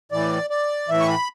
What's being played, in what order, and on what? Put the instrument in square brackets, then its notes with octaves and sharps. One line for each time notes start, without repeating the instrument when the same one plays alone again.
[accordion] A2 E3 D5
D5
A2 E3 E5
C#6
B5